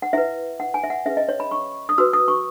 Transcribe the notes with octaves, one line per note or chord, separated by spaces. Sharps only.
F#5
E4 B4 E5
F#5
G#5
E5
F#5
C#4 G#4 B4 E5
D#5
C#5
B5
C#6
D#6
F#4 B4 E6
D#6
C#6